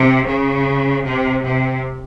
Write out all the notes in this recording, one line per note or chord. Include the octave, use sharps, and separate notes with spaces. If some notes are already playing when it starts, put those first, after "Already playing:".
Already playing: C3
C#3
C3
C3